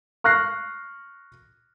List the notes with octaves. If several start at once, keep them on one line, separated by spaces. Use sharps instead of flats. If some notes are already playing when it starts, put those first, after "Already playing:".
C#6 F6 F#6 A#6 C7